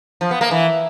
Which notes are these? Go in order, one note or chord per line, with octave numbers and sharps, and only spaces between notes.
F3
B3
A#3
E3